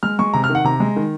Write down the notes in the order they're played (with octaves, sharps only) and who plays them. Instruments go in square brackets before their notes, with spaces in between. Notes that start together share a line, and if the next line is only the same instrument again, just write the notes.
[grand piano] G#3 F6
G#3 C#6
C3 A#5
F6
D#3
F#5
C3 A#5
G#3
D#3